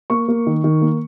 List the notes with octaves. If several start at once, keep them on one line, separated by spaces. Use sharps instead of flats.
A#3 C#6
A#3
D#3
D#3
A#3